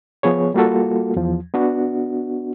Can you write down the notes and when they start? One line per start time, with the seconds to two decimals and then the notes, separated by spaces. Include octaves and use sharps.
0.23 F3 B3 G#4 C#5
0.54 G3 A#3 F4 F#4 A4
1.16 E2 F3
1.54 B3 D4 F#4